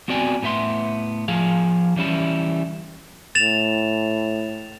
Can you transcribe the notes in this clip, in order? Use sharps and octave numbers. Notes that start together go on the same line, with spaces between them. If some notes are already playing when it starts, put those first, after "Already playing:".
B3 C4 F#4 D5 G5 G#5
A2 B3 E5 C6
F3 G#4 F5
E3 G3 C#4 E4
A2 A6 E7 F7